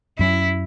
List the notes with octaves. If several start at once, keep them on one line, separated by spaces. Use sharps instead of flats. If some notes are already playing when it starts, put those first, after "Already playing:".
F#2 F#3 C#4 E4